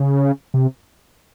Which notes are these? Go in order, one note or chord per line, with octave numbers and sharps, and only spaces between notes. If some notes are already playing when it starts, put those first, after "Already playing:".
Already playing: C#3
C3